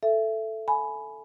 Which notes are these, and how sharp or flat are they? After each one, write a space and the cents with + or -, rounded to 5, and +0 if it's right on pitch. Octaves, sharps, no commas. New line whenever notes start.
A4 +0 E5 +20
G#5 +25 B5 +0